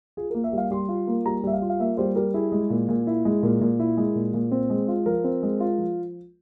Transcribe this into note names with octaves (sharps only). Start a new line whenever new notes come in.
F4 G#4
A#3 A#4
E5
G3 F5
G3 C6
F4
A#3
G3 A#5
G3 E5
F5
F4
F5
A#3 E5
G3 C5
G3 A#4
E4 G#4
G#3
A#2
A#2
E4
G#3
A#2 A#4
A#2
E4
G#3
A#2
A#2
C4
G#3
F4
F3 A#4
C4
G#3
F4
F3